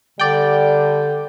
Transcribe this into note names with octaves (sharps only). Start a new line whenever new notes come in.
D3 G3 D5 G5